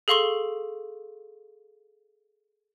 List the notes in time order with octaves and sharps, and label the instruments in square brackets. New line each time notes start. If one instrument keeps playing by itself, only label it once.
[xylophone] G#4 A4 F5 C6 C#6 G7